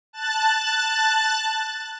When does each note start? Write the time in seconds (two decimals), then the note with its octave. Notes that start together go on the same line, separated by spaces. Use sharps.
0.13 A5 F#6 A6